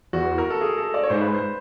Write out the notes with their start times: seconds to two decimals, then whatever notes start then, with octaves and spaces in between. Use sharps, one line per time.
0.13 E2 F#4
0.38 A#4
0.50 A4
0.61 G#4
0.78 A4
0.94 D5
1.03 C#5
1.10 G#2 C5
1.21 B4
1.34 C5